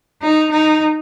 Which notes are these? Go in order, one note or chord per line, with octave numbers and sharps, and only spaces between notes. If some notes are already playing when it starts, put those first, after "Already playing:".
D#4
D#4